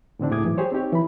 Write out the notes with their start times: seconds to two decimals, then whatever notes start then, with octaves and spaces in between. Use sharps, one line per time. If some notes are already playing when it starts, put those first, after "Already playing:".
0.19 A2 D3 C4 D4
0.31 C#2 A2 G#4 D6 D#6 G#6
0.44 G#2 E3 F#3
0.58 G4 G#4 C5 C#5
0.72 C4 D#4 G4 C#5
0.92 E3 B5